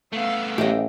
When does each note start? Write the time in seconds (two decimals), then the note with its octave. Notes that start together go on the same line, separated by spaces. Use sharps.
0.13 A3 B3 F5 E6
0.58 A1 G4 D#5